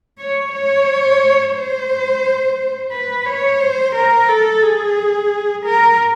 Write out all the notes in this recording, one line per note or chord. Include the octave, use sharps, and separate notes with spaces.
C#5
C#5
C5
B4
C#5
C5
A#4
A4
G#4
A#4